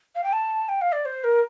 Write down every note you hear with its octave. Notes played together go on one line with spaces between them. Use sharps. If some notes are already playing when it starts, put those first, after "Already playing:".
F5
G5
A5
G5
F5
D5
C5
A#4